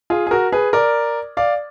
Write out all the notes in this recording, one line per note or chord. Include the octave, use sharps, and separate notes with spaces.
F4 G#4
G#4
F#4 A#4
G#4 B4
A#4 D5
D5 F5